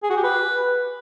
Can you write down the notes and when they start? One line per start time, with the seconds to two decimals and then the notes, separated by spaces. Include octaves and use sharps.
0.03 G#4
0.10 F#4
0.17 G4
0.23 B4